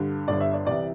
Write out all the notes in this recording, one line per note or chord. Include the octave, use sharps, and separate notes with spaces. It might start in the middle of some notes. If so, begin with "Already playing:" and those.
Already playing: G2 D3
G1 G2 D3 D5
E5
D5
C2 C3 E3 D5